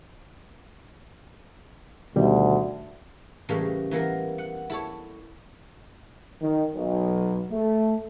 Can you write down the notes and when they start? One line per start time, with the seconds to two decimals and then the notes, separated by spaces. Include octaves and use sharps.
2.16 D2 B2 D#3 G3
3.49 A2 C#3 E3 G3 A#3
3.91 E3 A#3 B3 A#4
4.38 F#5
4.70 E4 A4 C#5
6.41 D#3
6.74 B1
7.51 A3